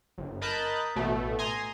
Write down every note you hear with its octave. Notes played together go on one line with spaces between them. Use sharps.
G1
A#4 D#5 A5 B5 F#6 G6
A1 B2 A3
G#5 A#5 C6 D#6